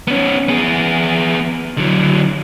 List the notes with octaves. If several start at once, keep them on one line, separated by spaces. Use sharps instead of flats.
B3 C#4
B3 G#4
D3 F#3